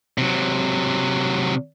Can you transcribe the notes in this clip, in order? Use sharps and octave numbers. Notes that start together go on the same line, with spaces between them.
C3 F#3